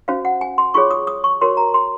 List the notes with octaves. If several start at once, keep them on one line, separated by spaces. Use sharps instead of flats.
C#4 F#4 C5 F5
F#5
G#5
C6
F4 G#4 C#5 C#6
D#6
D#6
C#6
F#4 A#4 C#5 C6
A#5
C6